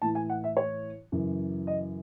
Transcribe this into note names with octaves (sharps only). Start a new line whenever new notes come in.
A2 E3 A5
G#5
F#5
E5
C#5
F#2 C#3 E3
D#5